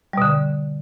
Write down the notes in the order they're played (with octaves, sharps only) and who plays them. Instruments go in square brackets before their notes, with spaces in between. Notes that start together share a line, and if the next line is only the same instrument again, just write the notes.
[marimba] G3
B2
D3